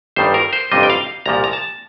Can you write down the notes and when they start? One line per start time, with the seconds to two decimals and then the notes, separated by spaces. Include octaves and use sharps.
0.16 G1 G2 D#3 G3 C5
0.34 A#4
0.53 C5
0.72 G1 F2 C3 G3 D#5
0.83 G5
0.90 F5
1.26 C2 A#2 F3 A#5
1.44 A#5
1.53 A5